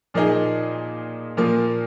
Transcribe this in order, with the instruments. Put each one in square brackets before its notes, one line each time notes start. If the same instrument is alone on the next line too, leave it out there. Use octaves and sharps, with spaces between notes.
[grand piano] A#2 F3 A#3 D#4 G#4
A#2 F3 A#3